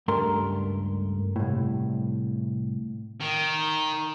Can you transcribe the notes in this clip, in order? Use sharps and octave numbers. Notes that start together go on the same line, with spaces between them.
C#2 G2 A3 A#4 C6
C2 A2
D#3